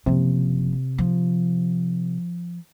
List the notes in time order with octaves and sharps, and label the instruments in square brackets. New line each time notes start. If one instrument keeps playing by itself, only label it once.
[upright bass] F#1 F3 [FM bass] C3
[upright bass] F3